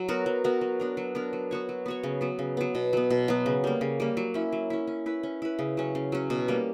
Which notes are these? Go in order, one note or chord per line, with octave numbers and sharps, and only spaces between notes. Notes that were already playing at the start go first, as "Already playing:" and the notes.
Already playing: F#3
B3 F#4 A#4
F#3
B3 F#4 A#4
F#3
B3 D4 A#4
F#3
B3 D4 A#4
F#3
B3 F#4 C#5
F#3
B3 F#4 C#5
C#3
F#3 B3
C#3
F#3 B3
B2
F#3 B3
B2
F#3 B3
C#3
G3 A#3
C#3
G3 A#3
F#3
C#4 E4
F#3
C#4 E4
C#4
E4 B4
C#4
E4 B4
C#3
F#3 C#4
C#3
F#3 C#4
B2
G3 A#3